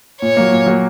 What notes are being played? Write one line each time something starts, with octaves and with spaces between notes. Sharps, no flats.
A#2 C#5
F#3 A#3
A#2
F#3 A#3